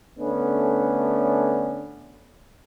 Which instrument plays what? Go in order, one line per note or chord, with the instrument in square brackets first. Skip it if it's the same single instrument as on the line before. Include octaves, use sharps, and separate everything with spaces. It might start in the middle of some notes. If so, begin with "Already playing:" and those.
[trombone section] D3 A3 B3 C#4 D4